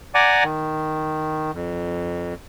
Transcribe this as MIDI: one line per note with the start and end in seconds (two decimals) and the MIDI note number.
0.14 0.43 74
0.14 0.43 78
0.14 0.43 80
0.14 0.43 82
0.14 0.43 86
0.44 1.51 51
1.54 2.34 41